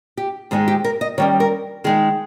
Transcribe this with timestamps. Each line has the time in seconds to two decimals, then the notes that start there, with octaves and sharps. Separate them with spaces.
0.17 G4
0.51 G#2 D#3 G#3 D#4 G#4
0.68 G4
0.84 A#4
1.01 D#5
1.18 D#3 G3 C#4 C#5
1.40 A#4
1.84 D#3 G#3 D#4 G#4